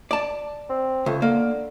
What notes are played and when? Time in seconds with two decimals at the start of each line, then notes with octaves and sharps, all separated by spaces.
0.11 D5 A5
0.70 C4
1.06 C#2 A3
1.22 D3 A#3